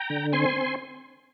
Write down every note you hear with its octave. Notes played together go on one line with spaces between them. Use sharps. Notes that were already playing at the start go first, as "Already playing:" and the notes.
Already playing: G5 A#5
D3
C4 G#5 C6
C4